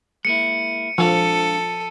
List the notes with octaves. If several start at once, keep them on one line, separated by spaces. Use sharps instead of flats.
G#3 A#3 E4 C#7 D#7
F3 G#3 D4 A4 F5